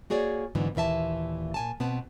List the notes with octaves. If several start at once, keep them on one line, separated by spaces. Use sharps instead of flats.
A#3 F#4 G#4 C#5 D5
G#2 D3 E3 F#3 B3
D#2 A#2 E3 E5 A5
A#2 G#5 A5
B2 B3 C4 A5